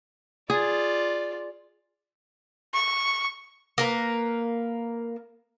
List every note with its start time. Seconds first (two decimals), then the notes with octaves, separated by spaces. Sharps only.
0.50 F4 G#4 D5
2.74 C#6
3.78 A#3 A#4 B4